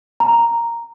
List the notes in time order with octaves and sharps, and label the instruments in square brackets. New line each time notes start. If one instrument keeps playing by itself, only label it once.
[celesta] A#5